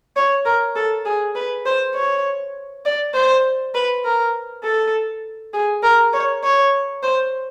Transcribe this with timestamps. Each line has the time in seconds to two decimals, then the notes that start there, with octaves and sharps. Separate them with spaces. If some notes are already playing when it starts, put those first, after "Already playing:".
0.16 C#5
0.45 A#4
0.76 A4
1.05 G#4
1.35 B4
1.66 C5
1.95 C#5
2.85 D5
3.14 C5
3.75 B4
4.05 A#4
4.63 A4
5.53 G#4
5.83 A#4
6.13 C#5
6.44 C#5
7.03 C5